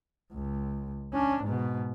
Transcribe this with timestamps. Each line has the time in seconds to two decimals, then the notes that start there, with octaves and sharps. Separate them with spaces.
0.32 C#2
1.14 C#4 D4
1.43 G#2 B2